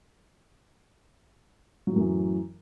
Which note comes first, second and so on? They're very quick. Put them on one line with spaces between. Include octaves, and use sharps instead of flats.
F#3 A2 F#2 E3